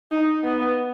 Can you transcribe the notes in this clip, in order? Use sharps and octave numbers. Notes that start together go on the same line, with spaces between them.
D#4
B3